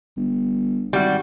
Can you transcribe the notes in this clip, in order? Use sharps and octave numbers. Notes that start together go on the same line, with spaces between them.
G1
G#1 G3 F#4